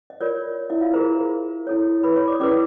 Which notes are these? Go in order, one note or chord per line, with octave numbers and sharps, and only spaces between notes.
D#5
F4 A#4 C#5 D5
E4 E5
F4 F5
F4 G#4 A#4 C5 A#5
E4 A4 C#5
B4 B5
C#5 C#6
D5 D6
D#6
C#4 E4 G#4 B4 D5 D6